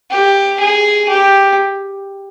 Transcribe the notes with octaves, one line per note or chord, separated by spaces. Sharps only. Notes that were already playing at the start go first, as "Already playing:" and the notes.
G4
G#4
G4